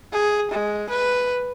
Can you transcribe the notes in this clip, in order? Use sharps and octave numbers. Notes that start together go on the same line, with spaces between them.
G#4
G#3
B4